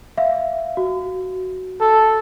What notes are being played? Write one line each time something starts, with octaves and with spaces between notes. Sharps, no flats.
E5 F5
F#4
A4